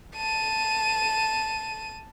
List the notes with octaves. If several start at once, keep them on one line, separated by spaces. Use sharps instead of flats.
A5 D#7